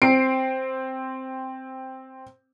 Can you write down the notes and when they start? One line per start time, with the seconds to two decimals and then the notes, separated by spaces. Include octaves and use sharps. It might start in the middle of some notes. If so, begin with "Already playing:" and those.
0.02 C4 C7 D7